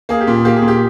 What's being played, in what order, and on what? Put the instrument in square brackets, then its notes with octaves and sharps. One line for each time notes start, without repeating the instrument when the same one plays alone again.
[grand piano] A#3 G#4
G4
A#2
A#3 G4
G#4
A#2
G4